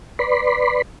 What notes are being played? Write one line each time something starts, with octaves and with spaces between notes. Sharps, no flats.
B4 D5 B5 C6